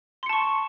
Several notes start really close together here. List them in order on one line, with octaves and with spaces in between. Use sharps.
C6 C#7 A5 C#6